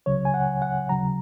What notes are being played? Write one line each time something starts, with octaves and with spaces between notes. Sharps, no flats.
C#2 C#3 F#3 C#5
G#5
F#5
F#5
D#2 C#3 F#3 A#5